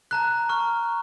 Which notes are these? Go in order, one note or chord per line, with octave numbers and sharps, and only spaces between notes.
A5 A#5 F#6
C#6 F6